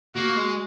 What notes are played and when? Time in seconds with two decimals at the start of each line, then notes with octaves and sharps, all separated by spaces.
0.15 A#3 F#4
0.35 G#3